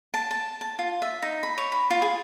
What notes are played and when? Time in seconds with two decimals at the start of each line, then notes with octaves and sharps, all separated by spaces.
0.14 A5
0.31 A5
0.61 A5
0.79 F4
1.02 E5
1.22 D#4
1.43 B5
1.58 C#5
1.72 B5
1.90 F4
2.02 G#4